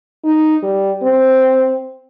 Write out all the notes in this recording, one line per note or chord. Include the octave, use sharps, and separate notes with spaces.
D#4
G3
C4